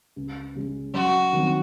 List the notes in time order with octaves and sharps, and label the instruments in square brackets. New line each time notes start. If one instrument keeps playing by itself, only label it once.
[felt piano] C#2
C#3 G#3
[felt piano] F#2 [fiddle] F#4
[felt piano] D#3 F#3 C4